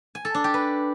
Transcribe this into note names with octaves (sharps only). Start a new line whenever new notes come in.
G#5
A4
D4
G4
B4